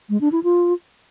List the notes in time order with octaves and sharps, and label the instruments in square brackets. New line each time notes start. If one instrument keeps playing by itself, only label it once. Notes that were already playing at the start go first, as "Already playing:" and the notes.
[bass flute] G#3
D4
E4
F4